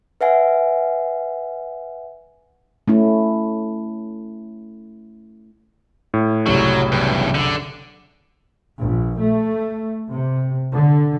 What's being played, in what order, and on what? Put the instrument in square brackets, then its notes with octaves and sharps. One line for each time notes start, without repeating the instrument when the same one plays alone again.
[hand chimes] B4 E5 F#5 G#5
[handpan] A3 C#4 E4
[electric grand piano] A2
[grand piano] F#1 C2 F#2 [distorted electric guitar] F#3
[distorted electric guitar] E2 G2
D3
[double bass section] A#1
A3
C3
D3